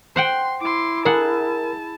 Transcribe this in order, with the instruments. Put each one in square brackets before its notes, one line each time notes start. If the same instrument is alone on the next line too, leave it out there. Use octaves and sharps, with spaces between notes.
[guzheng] C5 F#5 G5 [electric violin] C6
[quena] E4 [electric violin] C6 D6
[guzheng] G#4 F#5 [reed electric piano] A#4 [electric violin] A5